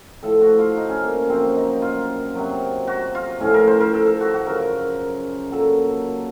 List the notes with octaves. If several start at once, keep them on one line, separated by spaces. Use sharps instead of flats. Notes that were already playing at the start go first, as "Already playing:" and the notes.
A2 F3 A4
F#4
F4
D#4
C#4
A#3
F#2 F3 C4
D#4
F4
C3 F#3
F#4
F4
A2 F3 C#4
A#4
C5
A#4
A4
A4
F#4
F#4
F#2 C#3 F3 A#4
A#2 F#3 A4